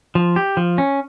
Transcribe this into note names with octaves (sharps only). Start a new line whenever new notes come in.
F3
G4
F3
C#4